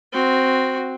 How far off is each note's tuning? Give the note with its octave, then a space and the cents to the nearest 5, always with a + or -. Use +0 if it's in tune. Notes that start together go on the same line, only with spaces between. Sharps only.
C4 +0 F#4 -5